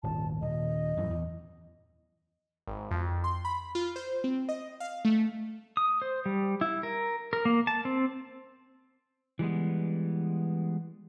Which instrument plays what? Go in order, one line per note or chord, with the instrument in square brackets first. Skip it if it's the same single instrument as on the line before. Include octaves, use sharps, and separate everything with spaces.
[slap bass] D#1 G#1 F3 [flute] A5
[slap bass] D#1 [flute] D#5
[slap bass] F#2 A2 E3
E2
[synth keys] G#1
F2
C6
B5
F4
C5
C4
D#5
F5
A3
[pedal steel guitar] D#6
C5
G3
E4
A#4
A#4
A#3
A5
C4
[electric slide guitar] E3 G3 G#3 B3